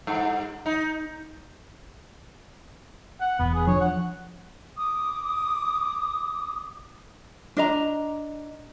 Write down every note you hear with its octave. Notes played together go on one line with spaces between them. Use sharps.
G2
D#4
F#5
E1 B3
G#4
F3 D4 C#5
F#5
D6 D#6
D4 D#5 A#5